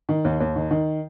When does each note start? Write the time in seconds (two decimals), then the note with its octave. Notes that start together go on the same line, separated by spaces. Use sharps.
0.09 D#3
0.25 D#2
0.40 D#2
0.56 D#3
0.71 D#3